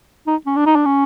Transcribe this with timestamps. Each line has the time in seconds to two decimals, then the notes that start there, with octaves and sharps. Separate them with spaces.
0.27 D#4
0.46 C#4
0.56 D4
0.66 D#4
0.76 D4
0.85 C#4